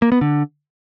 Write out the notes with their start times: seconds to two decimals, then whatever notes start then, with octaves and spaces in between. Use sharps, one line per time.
0.02 A#3
0.12 B3
0.21 D3